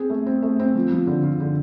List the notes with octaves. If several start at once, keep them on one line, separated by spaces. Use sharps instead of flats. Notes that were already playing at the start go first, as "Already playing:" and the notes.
Already playing: C4 G#4
A3
C4
A3
C4
F3
F3
D3
F4
D3